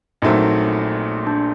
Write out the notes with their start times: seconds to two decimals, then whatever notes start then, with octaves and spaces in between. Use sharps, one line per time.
0.22 A#1 A#2 F#3 A3 C4 D#4
1.27 D4